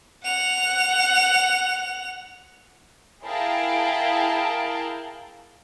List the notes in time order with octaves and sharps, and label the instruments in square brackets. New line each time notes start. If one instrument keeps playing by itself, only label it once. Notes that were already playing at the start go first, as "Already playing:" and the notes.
[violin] F#5 F7
[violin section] E4 G#4 A#4 F5 G5 A5